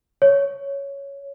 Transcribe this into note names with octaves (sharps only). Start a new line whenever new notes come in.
C#5